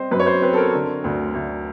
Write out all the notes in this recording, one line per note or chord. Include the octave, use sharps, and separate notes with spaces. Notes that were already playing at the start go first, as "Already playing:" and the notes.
Already playing: G3 C4 C5 D#5
F#2 B4
C#5
C5
C4 B4
A4
A#4
D3
D2
D2